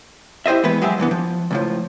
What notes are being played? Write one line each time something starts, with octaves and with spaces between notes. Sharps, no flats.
E4 G4 C5 D#5 E5
E3 G#3 B3 B4
F#3 G#3 G4 G#4 E5
C2 G2 E3 B3
F3
C#2 A2 F3